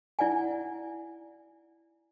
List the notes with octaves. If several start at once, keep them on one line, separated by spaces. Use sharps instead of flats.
E4 D5 F#5 G#5